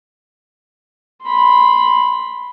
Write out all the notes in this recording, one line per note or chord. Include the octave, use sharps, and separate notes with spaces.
B5 C6